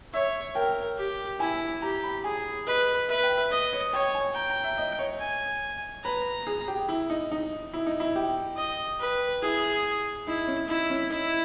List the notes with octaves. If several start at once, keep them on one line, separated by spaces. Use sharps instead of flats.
C#5 E5
A#4 G5
G4
E4 G#5
G4 A#5
B5
G#4 G#5
B4 D#5
B4 E5
G5
E5
B4 D#5
C#5
C#5 G5
G#5
G5 A#5
A#5
E5
D#5
C#5
G#5
B4 A#5
G#4
G4
E4
D#4
D#4
E4
D#4
E4
G4
D#5
B4
E4 G#4
D#4 E4
C#4
D#4 E4
C#4
D#4 E4